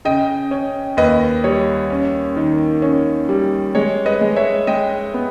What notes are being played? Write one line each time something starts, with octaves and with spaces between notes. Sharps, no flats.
C#3 D#5 G5
C#4
D#2 B4 D#5
G3 C#5
C#4
D#3
C#4
G3
G#3 C#5
B4 D#5
G#3
C#5 E5
G#3 D#5 G5
B3